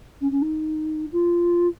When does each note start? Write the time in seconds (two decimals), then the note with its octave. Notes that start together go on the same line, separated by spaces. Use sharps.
0.20 C#4
0.31 C#4
0.41 D#4
1.12 F4